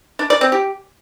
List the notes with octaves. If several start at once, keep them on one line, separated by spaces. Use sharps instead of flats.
D4
D5
C4
G4